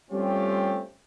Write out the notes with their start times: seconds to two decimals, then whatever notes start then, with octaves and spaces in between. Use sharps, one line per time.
0.11 G3 A3 C4 C#4 F4 G4